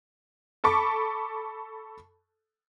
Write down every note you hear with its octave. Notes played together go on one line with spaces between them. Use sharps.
A4 A5 B5 C#6 D6